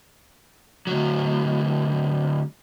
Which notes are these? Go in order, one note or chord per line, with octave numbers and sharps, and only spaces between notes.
D2 F#3